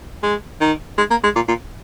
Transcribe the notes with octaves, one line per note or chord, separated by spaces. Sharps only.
G#3
D#3
G#3
A#3
G#3
A#2
A#2